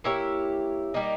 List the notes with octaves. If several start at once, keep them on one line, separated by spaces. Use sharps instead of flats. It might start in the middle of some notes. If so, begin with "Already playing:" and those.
A#3 E4 G4 C#5
G3 A#3 D#4